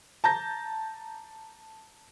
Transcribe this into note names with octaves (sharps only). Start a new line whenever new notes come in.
A5 A#5 G6 A#6